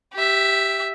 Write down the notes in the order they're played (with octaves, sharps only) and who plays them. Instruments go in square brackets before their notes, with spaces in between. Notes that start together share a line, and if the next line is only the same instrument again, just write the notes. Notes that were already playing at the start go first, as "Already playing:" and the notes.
[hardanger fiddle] G4 E5